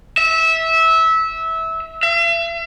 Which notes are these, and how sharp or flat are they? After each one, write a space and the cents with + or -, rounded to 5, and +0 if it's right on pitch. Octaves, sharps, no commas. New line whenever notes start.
E5 -20
E5 +45